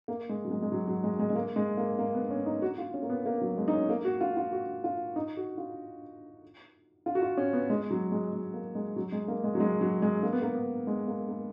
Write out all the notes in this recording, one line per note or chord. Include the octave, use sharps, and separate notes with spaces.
A#3
G#3
F#3
G#3
G#3
F#3
F#3
G#3
G#3
G#3
A#3
G#3
A#3
A#3
B3
C#4
D#4
F#4
F4
C#4
A#3
B3
A#3
F#3
G#3
D#4
C#4
A#3
F#4
F4
F4
F#4
F4
D#4
F#4
F4
F4
F#4
F4
C#4
B3
G#3
F#3
G#3
G#3
A#3
G#3
F#3
G#3
A#3
G#3
F#3
G#3
F#3
G#3
A#3
B3
A#3
B3
G#3
A#3
A#3